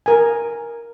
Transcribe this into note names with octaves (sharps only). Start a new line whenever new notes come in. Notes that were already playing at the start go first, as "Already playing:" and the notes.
A#4 G#5